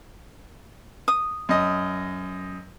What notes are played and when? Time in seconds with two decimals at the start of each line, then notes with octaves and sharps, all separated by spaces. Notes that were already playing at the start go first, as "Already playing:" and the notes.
1.08 D#6
1.49 F#2 D#5